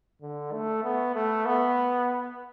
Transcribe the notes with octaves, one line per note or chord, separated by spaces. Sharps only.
D3
A3
B3
A3
B3